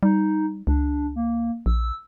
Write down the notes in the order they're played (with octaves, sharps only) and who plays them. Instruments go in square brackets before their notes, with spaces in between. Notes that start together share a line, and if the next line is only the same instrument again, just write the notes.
[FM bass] G3 [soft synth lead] D#4
[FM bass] C#2 [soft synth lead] D4
[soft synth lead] A#3
[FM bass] A#1 [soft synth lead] E6